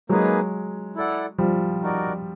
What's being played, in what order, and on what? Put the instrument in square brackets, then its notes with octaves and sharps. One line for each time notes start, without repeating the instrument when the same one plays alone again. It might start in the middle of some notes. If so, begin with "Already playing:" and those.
[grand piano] F#3 G#3 [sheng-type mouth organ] A#3 D#4 G#4 B4
[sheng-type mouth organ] E4 A4 D5 F#5
[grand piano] F3 G3
[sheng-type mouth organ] D#4 F#4 A#4 D5